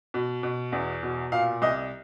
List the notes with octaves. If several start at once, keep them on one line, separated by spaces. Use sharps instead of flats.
B2
B2
E2
B2
A#2 F5
C2 D#5